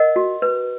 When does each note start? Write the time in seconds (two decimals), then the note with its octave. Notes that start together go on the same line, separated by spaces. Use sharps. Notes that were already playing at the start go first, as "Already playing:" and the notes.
Already playing: A#4 D#5 F#5
0.16 F#4
0.42 B4